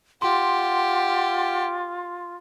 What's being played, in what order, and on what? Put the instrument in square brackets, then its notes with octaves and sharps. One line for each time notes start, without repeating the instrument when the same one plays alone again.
[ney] F4 [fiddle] G4 [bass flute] F#5 [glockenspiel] C6